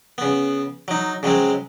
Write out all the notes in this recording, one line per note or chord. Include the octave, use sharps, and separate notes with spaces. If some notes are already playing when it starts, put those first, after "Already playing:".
C#3 B3
F#3 D#4
C#3 F#3 G#3 C4